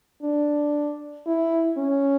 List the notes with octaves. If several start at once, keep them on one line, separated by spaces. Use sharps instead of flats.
D4
E4
C#4